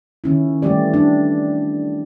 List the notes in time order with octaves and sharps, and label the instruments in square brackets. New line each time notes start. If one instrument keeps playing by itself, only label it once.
[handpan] D#3 C#4 E4
E3 G3 A3 G4 D5
D4